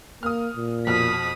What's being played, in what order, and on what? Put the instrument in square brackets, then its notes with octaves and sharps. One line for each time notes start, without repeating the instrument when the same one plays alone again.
[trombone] A#3 [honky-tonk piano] D#6 F6
[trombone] A#2
[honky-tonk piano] F2 B2 F6 [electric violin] D#6 B6